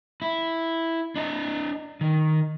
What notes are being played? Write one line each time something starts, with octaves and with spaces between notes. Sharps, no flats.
E4
D4 D#5
D#3